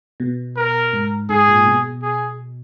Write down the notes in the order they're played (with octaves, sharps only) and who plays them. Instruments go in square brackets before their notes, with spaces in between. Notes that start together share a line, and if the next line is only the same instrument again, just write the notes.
[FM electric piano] B2
[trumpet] A#4
[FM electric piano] G#2
[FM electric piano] G#2 [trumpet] G#4
[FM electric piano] A#2
B2
[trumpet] G#4